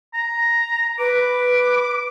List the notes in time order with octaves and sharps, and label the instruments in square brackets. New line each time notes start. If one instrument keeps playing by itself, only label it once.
[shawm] A#5
[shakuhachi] B4 [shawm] D6